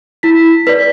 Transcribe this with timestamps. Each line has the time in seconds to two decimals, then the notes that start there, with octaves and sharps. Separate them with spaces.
0.23 E4 B6
0.67 B4 D5 B6